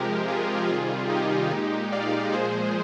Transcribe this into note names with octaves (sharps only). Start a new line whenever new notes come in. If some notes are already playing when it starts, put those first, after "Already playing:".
Already playing: C3 F3 G#3 G4 A#4
F4 G#4
C3 D#3 G3 F4 G#4
D#4 G4
A#2 G#3
D5 F5
A#2 F3 G#3 G#4 C5